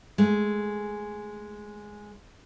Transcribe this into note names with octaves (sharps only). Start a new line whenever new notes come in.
G#3 A3